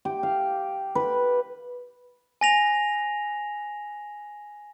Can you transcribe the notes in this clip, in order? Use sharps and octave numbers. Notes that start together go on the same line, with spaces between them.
G4
F5
B4
G#5 A#6 F7